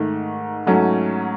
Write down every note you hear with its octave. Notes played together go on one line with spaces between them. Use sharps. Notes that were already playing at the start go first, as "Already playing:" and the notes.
Already playing: G#2 D#3 A3
G#2 F#3 A3 C#4